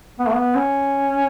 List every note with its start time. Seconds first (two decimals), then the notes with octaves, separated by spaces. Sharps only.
0.19 B3
0.27 A3
0.35 B3
0.55 C#4